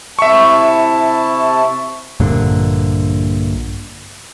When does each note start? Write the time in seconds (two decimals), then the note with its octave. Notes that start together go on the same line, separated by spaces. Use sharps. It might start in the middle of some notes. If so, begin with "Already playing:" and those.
0.19 C3 E4 E5 A5 C#6
2.20 A#1 G2 A#2 D3